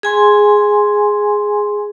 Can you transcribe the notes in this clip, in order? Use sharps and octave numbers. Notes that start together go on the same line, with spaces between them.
G#4 G#5 C6